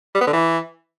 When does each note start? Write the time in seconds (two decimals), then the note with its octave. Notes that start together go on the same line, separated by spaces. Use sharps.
0.15 G3
0.21 B3
0.27 D3
0.33 E3